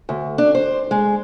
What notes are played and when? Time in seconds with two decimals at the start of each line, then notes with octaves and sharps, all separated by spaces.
0.09 D2
0.38 D4
0.55 C5
0.91 G#3